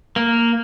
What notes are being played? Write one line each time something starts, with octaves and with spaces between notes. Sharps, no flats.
A#3